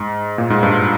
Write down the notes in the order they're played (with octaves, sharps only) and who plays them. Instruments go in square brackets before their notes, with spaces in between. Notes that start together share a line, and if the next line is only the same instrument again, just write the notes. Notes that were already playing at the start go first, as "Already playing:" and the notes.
Already playing: [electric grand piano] G#2
A#2
G#2
G2